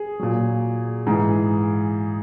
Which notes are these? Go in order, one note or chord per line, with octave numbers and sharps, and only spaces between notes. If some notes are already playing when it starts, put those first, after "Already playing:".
Already playing: G#4
A#2 F#3
G#2 E3 G#4